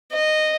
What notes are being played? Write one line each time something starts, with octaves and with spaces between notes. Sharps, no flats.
D#5